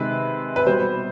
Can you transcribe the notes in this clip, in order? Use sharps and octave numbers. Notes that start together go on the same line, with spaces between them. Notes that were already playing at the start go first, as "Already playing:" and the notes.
Already playing: C3 D#3 G#3 B4
B4
B2 G3 B3 C5